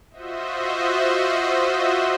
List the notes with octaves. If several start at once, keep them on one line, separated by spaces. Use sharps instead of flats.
F4 F#4 C5 D#5 E5